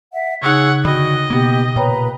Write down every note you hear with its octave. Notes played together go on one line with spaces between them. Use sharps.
E5 F#5
C#3 D#4 G#4 C#5 F#5 E6
D3 F#4 D#5 G5 B5
B2 A#3 B3 G4
A#2 B4 C#5 G5 A#5 B5